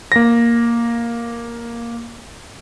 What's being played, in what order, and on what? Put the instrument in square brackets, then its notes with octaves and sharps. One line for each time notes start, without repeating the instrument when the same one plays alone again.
[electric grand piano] A#3 A#6